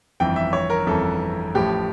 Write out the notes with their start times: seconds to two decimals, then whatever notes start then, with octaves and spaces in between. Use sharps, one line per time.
0.20 G1 F2 E3 G5
0.36 E5
0.53 C#5
0.70 A#4
0.87 G1 F2 E3 A4
1.55 A1 A2 F3 G4